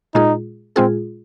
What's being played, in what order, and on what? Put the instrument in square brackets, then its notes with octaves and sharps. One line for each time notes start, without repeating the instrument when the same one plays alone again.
[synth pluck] A#2 G#3 F4 G#4 [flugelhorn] D#4
[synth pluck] A#2 G#3 F4 G#4 [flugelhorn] C4